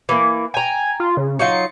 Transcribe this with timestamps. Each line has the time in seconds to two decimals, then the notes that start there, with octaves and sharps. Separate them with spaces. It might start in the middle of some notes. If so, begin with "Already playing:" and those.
0.09 E3 A#3
0.54 G5 G#5 A#5
1.00 F4
1.17 C#3
1.39 F#3 D#4 F4 C#7